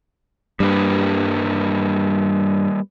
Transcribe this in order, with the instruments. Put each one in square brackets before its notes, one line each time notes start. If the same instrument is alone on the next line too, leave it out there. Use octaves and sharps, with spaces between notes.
[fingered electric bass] G2 [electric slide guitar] G3 A#3 B4